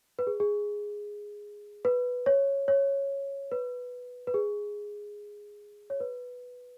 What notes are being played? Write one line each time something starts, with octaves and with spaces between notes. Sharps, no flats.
B4
G#4
G#4
B4
C#5
C#5
B4
B4
G#4
C#5
B4